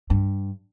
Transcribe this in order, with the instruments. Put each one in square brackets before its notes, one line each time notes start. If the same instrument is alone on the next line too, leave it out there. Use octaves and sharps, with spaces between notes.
[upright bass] G2